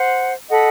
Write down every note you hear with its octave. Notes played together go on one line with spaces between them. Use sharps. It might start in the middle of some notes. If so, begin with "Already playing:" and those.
Already playing: C5 F#5 C6
A4 D#5 F#5 B5